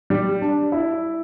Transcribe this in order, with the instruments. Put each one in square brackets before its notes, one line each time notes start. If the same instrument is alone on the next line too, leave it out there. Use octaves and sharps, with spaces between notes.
[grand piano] G3
D4
E4